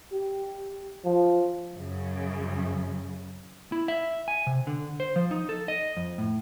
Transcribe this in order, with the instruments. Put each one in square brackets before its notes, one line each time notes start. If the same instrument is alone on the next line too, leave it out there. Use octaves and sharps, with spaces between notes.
[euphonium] G4
F3
[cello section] F#2 C#3
[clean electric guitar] E4
E5
G#5
C3
D3
C5
F3
D#4
A4
D#5
F2
A2